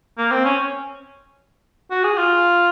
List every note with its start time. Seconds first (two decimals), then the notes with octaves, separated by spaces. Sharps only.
0.18 A#3
0.31 C4
0.45 C#4
1.91 F#4
2.04 G#4
2.17 F4